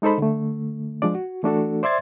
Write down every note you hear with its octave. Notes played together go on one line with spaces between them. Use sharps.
G#3 D#4 A4 C5 B5
D3 A3
F3 G#3 D4 D5
F#4
E3 A3 D4 F#4 A4
C5 D5 E5 C6 G#6 A6